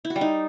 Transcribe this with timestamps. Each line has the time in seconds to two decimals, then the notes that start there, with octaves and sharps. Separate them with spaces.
0.05 E4
0.10 F#4
0.16 G3
0.21 D#4